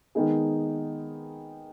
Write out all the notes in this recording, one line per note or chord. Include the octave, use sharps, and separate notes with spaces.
D#3 G#3 B3 D#4 G#4